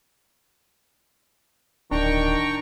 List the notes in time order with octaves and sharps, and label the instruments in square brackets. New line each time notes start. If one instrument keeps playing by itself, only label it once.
[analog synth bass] D1 [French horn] D#3 [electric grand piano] D4 [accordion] G5 A#5 C#6